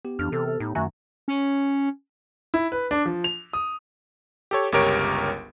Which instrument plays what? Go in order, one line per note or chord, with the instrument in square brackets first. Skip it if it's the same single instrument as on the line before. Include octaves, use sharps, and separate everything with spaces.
[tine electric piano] B3 G4
[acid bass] F2 [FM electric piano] E3 F6 [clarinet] D4
[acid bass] C3 [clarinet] A4
[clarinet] A4
[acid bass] A2 [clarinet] D#4
[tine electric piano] F#2 D#3 [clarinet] A3 [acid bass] F#4 [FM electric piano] E5 G#5 A#5
[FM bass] C#4
[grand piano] E4
B4
D4
F3
F7
D#6
[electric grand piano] G4 A4 C#5
G1 C#2 G4 A#4 C#5 D7